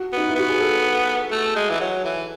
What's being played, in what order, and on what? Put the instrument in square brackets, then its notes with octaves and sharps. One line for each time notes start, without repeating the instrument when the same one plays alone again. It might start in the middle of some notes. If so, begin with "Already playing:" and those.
Already playing: [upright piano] F#4
[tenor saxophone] B3 [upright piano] D#4
[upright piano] E4
[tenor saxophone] B3 [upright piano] F#4
[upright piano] G#4
A4
[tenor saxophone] A3
G#3
E3
F#3
E3